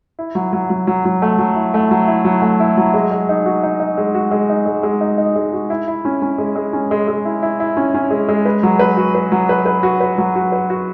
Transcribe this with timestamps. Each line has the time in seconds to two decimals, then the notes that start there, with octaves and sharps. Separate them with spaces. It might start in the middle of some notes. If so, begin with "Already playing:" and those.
0.19 E4
0.35 F#3
0.53 F#3
0.70 F#3
0.87 F#3
1.05 F#3
1.22 A3
1.38 F#3
1.56 E4
1.74 A3
1.91 F#3
2.08 E4
2.25 F#3
2.42 A3
2.60 E4
2.77 F#3
2.94 G#3
3.11 G#3
3.29 D#4
3.46 F#4
3.63 D#4
3.80 D#4
3.98 G#3
4.15 F#4
4.31 G#3
4.50 D#4
4.66 G#3
4.83 G#3
5.01 D#4
5.18 D#4
5.36 G#3
5.53 F#4
5.70 E4
5.88 E4
6.05 C#4
6.22 C#4
6.38 G#3
6.56 G#3
6.73 C#4
6.91 G#3
7.08 G#3
7.25 E4
7.43 E4
7.60 E4
7.77 C#4
7.94 C#4
8.11 G#3
8.29 G#3
8.45 B4
8.63 F#3
8.79 B4
8.97 F#4
9.15 B4
9.32 F#3
9.49 B4
9.66 B4
9.83 F#4
10.01 B4
10.18 F#3
10.35 F#4
10.52 B4
10.70 F#4